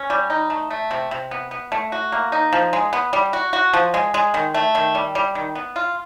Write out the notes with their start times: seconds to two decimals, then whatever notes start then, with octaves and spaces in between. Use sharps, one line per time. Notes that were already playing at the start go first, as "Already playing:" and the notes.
Already playing: C#4
0.10 G3
0.30 D#4
0.50 A3
0.70 A3
0.91 C3
1.11 C3
1.31 B3
1.51 B3
1.72 A3
1.92 F#4
2.12 A#3
2.32 D#4
2.53 F3
2.73 G#3
2.93 B3
3.13 G3
3.33 F#4
3.53 F#4
3.74 F3
3.94 G#3
4.14 G#3
4.34 D#3
4.54 A3
4.75 D#3
4.95 G3
5.15 G3
5.35 D#3
5.55 B3
5.76 F4